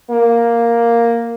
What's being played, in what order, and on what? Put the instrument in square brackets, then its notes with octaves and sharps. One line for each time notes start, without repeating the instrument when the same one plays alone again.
[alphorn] A#3